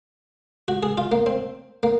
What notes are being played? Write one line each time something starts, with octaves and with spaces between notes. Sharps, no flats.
F#4
G#4
F4
A#3
C4
A#3